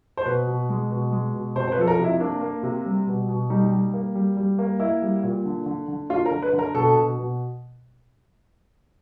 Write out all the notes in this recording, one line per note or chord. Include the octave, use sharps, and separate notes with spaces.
C5
B2 B4
B2
G#3
B2
G#3
B2
C3 C5
C5
B4
F3 A4
A#4
C3 E4
A#3 D4
A#3
C3
G3
B2
B2
G3 D#4
G3
A#3
G3
G3
A#3
A#3 E4
G3
A#2
D3
D3
D3
D3 F4
A#4
D3
B4
D3
A#4
B2 A4
B2
B2